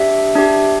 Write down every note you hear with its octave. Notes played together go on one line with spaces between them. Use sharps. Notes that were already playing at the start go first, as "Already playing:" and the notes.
Already playing: D4 G4 E5
D4 G4